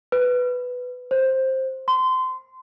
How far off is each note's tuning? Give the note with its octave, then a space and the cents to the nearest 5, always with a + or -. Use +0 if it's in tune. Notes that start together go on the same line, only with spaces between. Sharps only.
B4 +5
C5 +10
C6 -25